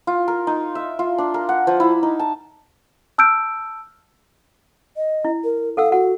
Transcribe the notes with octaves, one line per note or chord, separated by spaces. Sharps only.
F4
A#4
D#4
E5
F4
D4
A#4
F#5
F3
E4
D#4
A5
A5 E6 F6 G6 D7
D#5
E4
A#4
A4 F5 F#5 E6
F#4 F#5